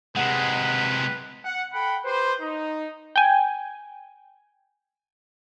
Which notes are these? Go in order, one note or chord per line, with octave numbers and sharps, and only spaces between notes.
C3 G#3 B4 F#5
F#5
A4 F#5 G5 B5
G4 B4 C5
D#4
G5 G#5